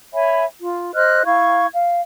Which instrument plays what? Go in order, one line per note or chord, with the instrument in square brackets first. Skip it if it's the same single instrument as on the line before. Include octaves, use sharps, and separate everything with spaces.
[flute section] C#5 E5 G#5 B5
F4
C5 D#5 F6 F#6
E4 F5 C#6 G#6
F5